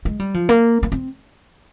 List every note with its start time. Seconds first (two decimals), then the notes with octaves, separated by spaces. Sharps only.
0.05 G#3
0.20 G3
0.34 F3
0.49 A#3
0.83 A#3
0.92 C4